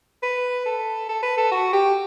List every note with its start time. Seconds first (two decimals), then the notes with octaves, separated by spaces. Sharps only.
0.23 B4
0.66 A4
1.09 A4
1.23 B4
1.38 A4
1.51 F#4
1.73 G4